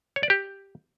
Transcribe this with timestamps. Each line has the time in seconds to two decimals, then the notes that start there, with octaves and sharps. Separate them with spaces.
0.16 C#5
0.23 D5
0.30 G4